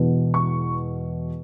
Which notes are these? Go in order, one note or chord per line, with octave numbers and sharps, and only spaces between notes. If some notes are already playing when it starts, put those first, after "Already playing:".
Already playing: E1 E2 B2
C#6